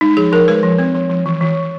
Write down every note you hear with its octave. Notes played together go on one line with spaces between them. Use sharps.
G#3 D#4
F3 G#4
F3 A#4
G#3 B4
F3
C4
F3
F3
E3
E3
E3